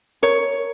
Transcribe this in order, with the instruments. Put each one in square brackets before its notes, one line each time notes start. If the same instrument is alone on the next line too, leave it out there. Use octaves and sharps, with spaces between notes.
[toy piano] A#4 D#5 A#5 C#6 [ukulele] C#5